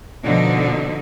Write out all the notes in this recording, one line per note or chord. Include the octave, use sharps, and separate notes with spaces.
B2 D3 F3 D#4